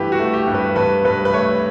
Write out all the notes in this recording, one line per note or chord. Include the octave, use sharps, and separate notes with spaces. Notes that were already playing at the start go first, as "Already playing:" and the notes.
Already playing: G2 E3 A3 G4 B4
F#4
A3
G4
G2
B4
G2 B4
G2 B4
B4
A3 C#5